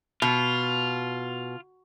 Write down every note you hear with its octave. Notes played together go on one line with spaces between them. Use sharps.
B2 F4